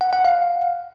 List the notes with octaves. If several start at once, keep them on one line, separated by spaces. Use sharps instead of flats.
F#5
F#5
F5